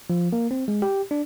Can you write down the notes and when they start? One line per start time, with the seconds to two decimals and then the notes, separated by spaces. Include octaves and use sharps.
0.10 F3
0.33 A#3
0.51 C4
0.68 G#3
0.82 G4
1.11 D4